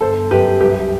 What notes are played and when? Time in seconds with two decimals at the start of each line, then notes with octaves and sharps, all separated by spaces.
0.01 G1 A4 C5
0.31 F#2 G4 B4
0.61 C2 G4 B4